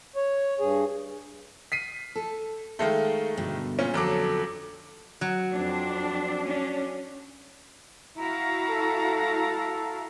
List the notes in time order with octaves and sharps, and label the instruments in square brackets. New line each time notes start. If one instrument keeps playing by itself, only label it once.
[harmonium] C#5
G2 G#4
[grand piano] B6 C7 D#7
[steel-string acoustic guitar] A4
[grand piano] D#3 G#3 A3 [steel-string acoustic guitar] A4 F5
[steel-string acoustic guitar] G2 B2 D3
[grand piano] A#2 C#4
[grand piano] F2 F#3 D6 [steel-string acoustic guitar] D3 A4
[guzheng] F#3
[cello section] F2 C4 D4
C#4 D4
[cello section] E4 F#4 F5 [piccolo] A#5
[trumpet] A4